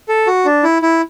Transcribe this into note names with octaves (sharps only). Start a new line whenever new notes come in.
A4
F#4
D4
E4
E4